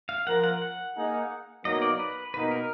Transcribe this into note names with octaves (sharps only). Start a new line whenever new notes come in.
F5
F3 A#3 F4 A#4 F#5
F#5
F#5
A#3 D#4 G#4
B2 F#3 A#3 D#4 D#5
D5
B4
B2 A#3 D#4 B4
A#4